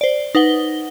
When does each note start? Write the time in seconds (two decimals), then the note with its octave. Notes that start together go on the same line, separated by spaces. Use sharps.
0.01 C5 D5
0.35 D#4 B4 F#5 G7